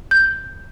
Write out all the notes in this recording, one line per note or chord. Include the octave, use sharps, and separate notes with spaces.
G6